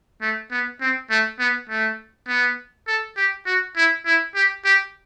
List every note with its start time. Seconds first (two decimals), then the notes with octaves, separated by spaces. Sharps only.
0.22 A3
0.51 B3
0.81 C4
1.10 A3
1.40 B3
1.69 A3
2.28 B3
2.88 A4
3.17 G4
3.46 F#4
3.76 E4
4.06 E4
4.35 G4
4.65 G4